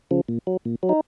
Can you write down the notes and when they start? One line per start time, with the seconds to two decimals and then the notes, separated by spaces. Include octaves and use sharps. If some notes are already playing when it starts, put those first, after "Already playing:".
0.11 C#3 F3
0.29 A#2
0.47 F#3
0.65 A#2
0.83 F#3
0.89 D#4